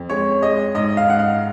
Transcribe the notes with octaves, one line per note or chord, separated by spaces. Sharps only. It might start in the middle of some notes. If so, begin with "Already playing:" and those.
Already playing: F2
G#3 C#5
G#3 D#5
G#2 D#5
F5
G#2 F#5
F5